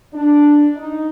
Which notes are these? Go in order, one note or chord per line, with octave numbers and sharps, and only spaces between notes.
D4
D#4